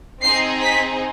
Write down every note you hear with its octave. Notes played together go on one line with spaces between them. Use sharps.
C4 D#4 G#4 C7
B6